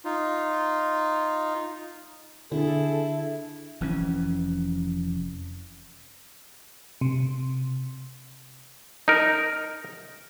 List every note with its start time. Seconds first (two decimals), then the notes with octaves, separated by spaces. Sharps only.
0.05 D#4 F4
2.51 D3 E4 G#4 A4
3.81 F1 F2 E3 C#4
7.01 C3
9.08 D#4 A#4